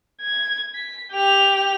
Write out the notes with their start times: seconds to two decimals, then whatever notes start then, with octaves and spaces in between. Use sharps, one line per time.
0.21 G#6
0.75 B6
1.13 G4 F7